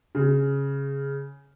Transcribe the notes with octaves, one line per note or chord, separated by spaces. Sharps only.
C#3